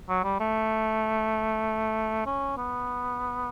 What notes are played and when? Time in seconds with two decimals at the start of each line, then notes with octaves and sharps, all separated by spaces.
0.09 F#3
0.24 G3
0.40 A3
2.26 C#4
2.57 B3